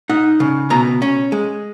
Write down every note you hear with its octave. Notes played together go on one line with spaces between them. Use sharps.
D#4 F#5
C#3
B2 A#5
C#4
G#3